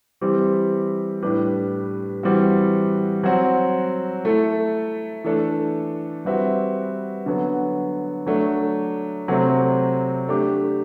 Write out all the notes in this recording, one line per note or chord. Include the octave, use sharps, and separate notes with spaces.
E3 G3 C4 G4
A2 G3 D4 G4 B4
E3 G3 C4 F#4
F#3 C4 F#4
A3 E4 A4
E3 A3 D4 A4
G3 C4 F#4 B4 E5
D3 F#3 B3
F#3 A3 D4
C3 F#3 A3 C4
A3 D4 G4